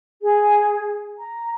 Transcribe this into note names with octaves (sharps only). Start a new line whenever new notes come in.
G#4
A#5